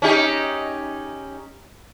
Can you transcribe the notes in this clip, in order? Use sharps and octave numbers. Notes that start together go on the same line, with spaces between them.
C#4 D#4 G4